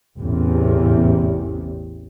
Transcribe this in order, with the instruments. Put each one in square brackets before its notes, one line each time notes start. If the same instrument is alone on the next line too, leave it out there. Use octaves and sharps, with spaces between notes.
[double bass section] A1 E2 C3